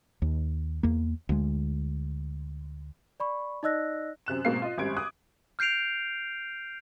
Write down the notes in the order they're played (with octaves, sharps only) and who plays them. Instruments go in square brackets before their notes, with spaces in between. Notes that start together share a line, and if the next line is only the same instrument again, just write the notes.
[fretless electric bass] D#2
E2 A#3
D2 G#3
[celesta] D5 B5 C#6
D#4 D5 D#5 E6 F#6 A#6
[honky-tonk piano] F#2 C3 F#6 E7
G#2 B2 A#3 C4 F5 C7
F4 D#5
G#1 F#2 G3 G#6 D7
D6 D#6 F#6
[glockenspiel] F6 G6 C7 D7 F7